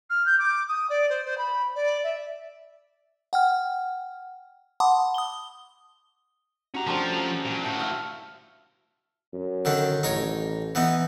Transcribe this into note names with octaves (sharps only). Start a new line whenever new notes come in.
F6
G6
D6
D#6
D5
C5
C5
B5
D5
E5
F#5 G5 F6
F#5 A5 B5 C6 D6 D#6
D#6 G7
C#4 F#4 G4 A#5
F3 A3 C4 D4
A#2
A2 F#4 F5 G5 A5
E5 F5
F#2
D3 D#3 D4
A1 D#4 A#4 C#5
E3 B3 D#4